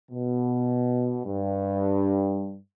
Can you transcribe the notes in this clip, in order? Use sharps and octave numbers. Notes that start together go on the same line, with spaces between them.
B2
G2